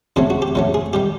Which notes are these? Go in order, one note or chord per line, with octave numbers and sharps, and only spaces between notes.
F2 C#3 F#3 A3 C4
F#4
G4
F2 C#3 F#3 A3
G#4
D#3 G3 G4